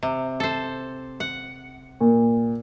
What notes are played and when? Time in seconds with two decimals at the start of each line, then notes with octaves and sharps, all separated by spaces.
0.03 C3
0.40 A4 C5
1.20 F#5
2.01 A#2